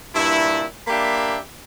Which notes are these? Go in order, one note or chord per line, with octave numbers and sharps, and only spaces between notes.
G2 A#2 E4
A#3 D4 G4 E5 B5